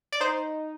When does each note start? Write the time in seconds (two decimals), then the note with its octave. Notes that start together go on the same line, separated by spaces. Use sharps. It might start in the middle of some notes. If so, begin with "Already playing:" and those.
0.12 D5
0.20 D#4 C5